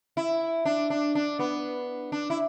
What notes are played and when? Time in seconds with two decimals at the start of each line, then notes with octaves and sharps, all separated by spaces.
0.17 E4
0.65 D4
0.90 D4
1.15 D4
1.39 B3
2.12 D4
2.30 E4